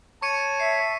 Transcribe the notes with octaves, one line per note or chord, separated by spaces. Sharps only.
C#5 A5 C#6 C#7 D#7
E5 C7